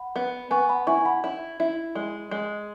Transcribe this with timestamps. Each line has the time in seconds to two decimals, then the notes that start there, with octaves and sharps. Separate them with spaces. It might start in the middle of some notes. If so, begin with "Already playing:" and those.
Already playing: F#5 B5
0.16 B3
0.51 B3 G#5 C#6
0.69 F#5 B5
0.87 E4 G#5 C#6
1.05 F#5 B5
1.24 E4
1.60 E4
1.95 G#3
2.31 G#3